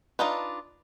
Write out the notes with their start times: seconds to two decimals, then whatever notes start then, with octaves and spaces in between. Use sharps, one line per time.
0.19 D4 D#4 F4 B4